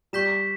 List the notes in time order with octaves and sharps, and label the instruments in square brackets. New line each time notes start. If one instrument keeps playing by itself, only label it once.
[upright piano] G3 [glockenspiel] C#6 G6 B6 E7